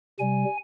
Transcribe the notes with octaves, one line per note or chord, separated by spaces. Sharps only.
C3 G3 G#5